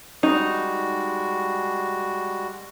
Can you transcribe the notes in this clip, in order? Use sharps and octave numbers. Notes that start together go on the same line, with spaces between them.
G3 G#3 D#4 F#4